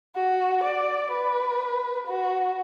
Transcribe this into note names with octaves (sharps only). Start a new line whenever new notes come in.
F#4
D5
B4
F#4